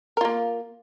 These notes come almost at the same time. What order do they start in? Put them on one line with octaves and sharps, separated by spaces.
A#4 F4 A#3